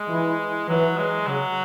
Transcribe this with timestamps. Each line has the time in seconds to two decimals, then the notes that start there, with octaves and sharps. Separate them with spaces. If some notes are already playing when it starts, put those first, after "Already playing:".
Already playing: G#3
0.10 E3
0.68 E3 F#3
0.98 G#3
1.27 C#3 F#3